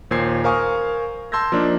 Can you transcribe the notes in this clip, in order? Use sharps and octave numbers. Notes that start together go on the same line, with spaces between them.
D#2 A#2 C5 G#6 C7
A#4 C5 F5 G#5 C#6 D#6
A5 C6 E6 G6 G#6 A#6
F3 A#3 D4 D#4